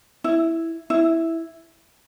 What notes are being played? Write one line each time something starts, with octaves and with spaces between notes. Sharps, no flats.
E4
E4